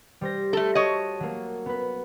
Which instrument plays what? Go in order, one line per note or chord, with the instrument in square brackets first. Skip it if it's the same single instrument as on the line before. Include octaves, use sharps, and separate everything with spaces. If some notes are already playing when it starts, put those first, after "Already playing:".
[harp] G3 C5 A#6
[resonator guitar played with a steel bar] A3 A4
[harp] F#4 A4 [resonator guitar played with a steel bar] C#5 D#5
[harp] F#3 A#3
B3 B4